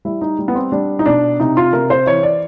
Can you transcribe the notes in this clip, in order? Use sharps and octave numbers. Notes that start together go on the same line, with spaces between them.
G3 E4
D#4
G3
B3
C4
G3 D4
D#4
B2 D4
C3 D#4
F4
C3 A#4
C5
E3 C#5
D5